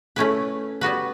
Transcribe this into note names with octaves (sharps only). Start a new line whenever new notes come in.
A3 C#4 E4 B4
G3 B3 F#4 B4